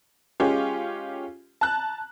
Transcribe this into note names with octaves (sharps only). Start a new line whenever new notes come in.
G#3 C#4 F4 G4
A5 A#5 F#6